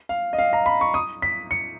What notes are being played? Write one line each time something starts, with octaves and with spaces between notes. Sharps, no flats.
F5
D#5
F5
A#5
B5
C#6
D#6
B6
C#7